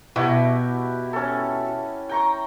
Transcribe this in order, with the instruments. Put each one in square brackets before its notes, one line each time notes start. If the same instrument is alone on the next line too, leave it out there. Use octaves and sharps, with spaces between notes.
[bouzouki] B2 [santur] E4 F#4 G4
[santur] C#4 A4
G5 A#5 C#6